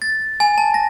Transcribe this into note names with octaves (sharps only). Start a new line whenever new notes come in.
A6
G#5
A5
A#6